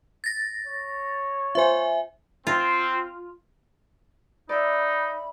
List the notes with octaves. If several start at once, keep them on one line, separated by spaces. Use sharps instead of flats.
A6 A#6
C#5
F4 C5 E5 G#5
C4 F4
D#4 D5 E5 B5